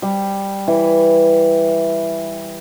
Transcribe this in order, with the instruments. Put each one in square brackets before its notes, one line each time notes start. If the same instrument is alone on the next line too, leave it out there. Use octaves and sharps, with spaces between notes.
[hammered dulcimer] G3
E3